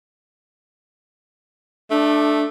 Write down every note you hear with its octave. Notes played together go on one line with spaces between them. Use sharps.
A3 D4